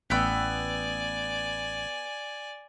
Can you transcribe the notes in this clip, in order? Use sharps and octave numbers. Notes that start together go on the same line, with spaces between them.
A1 B3 D5 G5 G#5 E6